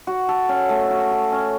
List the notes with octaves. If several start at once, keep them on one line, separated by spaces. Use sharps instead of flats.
F#4
A4
C#4
A3
F#4
A4
C#4